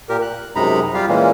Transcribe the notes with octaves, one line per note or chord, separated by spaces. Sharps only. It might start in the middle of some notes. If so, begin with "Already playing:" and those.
A#2 G4 A#4
F#6
F#2 C3 G#3 D#4 A#5 B5
G3 F4 G4 F5
A#2 E3 G#3 A#3 C#4